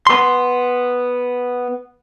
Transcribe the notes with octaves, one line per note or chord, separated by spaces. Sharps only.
B3 C6